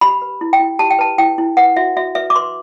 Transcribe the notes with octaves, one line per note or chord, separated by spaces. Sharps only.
G4 B5
B4
E4
G5
E4
G4 A5
G5
B4 A5
E4 G5
E4
B4 F#5
F#4 E5
F#4 E5
B4 E5
D6
B4 C6